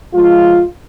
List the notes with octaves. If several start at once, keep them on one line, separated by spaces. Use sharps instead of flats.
F3 G#3 F4